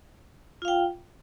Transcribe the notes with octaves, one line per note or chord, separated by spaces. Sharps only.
F4 F5 G5